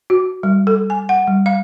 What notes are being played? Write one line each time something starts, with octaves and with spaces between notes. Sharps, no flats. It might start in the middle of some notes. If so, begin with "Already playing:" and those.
F#4
G3
A4
G#5
F#5
G3
F5